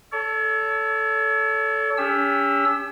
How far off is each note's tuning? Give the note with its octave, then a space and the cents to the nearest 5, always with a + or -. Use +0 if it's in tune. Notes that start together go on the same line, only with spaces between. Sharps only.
A4 +0 C#5 +40
C#4 +35 G4 +45 E6 +0